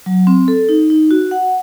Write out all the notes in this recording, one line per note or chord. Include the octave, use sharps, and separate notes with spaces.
F#3
C4
A4
D#4
D#4
F#4
F#5